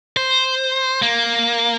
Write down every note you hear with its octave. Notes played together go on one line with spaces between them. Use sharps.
C5
A#3